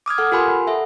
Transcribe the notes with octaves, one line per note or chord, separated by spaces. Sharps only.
D6 D#6 F6 G#6
A4 F#5 F6
F4 G4 A#4 G#5 B5 C6
A4 E5 F#5